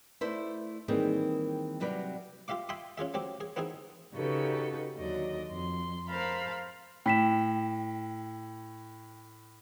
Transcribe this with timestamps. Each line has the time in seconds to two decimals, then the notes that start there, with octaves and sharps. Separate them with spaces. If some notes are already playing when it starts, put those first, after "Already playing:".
0.21 A3 E4 B4 C5 D5 E5
0.88 D#3 E3 G3 A#3 C4 G#4
1.80 C3 F#3 G3 B4 D5
2.48 F4 G4 E5 F5 D6
2.69 E5 G5 G#5 B5 C6 D#6
2.98 C#4 F4 G#4 E5
3.14 F#3 C4 G4
3.41 G#4
3.56 B3 C4 D#4 E4 G#4
4.14 C#3 D#4 F#4 G4 A4 B4
4.98 D#2 D3 F#3 D5 D#5
5.50 F2 C6
6.10 A#4 C5 F5 A5 B5
7.06 A2 G5 B6 E7